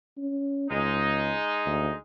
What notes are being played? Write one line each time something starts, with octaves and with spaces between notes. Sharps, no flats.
C#4
C#2 G#3 D#4
D2